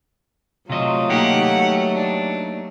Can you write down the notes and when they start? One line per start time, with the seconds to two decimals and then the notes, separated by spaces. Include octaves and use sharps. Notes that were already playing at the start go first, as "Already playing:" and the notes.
0.69 C3 F#3 A3 F4 D#5
1.10 A#3 D#4 G4 F#5
1.95 D4